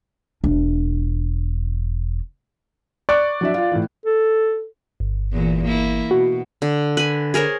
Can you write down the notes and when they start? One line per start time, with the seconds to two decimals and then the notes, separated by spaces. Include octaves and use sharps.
0.44 E1 D4
3.09 D5 C#6 F#6
3.41 F#3 D4 E5
3.54 F4 F5
3.72 A2 E3
4.06 A4
5.00 G1
5.32 E2 A#2 E3
5.64 A#3 E4
6.11 B2 F#4
6.62 D3
6.97 B4 G#5
7.34 G#4 A#4 C5 C#5